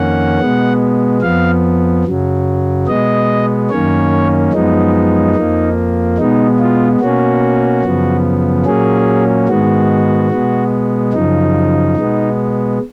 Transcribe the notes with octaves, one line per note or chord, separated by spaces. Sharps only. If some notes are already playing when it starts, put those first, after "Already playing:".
Already playing: F2 D#3 A#3 C#4 F#5
B2 G#3 B3
F2 F3 B3 F5
F#2 C#3 F#3
B2 G#3 B3 D#5
F#2 D#3 A#3 C#4 C#5
F#2 F3 G#3 B3 D#4
F2 F3 A#3
B2 G#3 B3 D#4
F4
B2 A#3 C#4 F#4
F#2 C#3 F3 B3
A#2 F#3 A#3 C#4 G#4
G#2 D#3 G#3 B3 F#4
B2 G#3 B3
F#2 C#3 F3 D#4
B2 G#3 B3